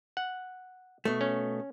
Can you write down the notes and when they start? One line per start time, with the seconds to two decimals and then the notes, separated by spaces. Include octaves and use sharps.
0.17 F#5
1.05 B2 A3
1.21 C#4